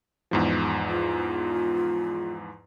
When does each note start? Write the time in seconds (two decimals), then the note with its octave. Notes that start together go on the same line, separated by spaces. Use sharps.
0.31 E2 G#2 F3
0.88 F4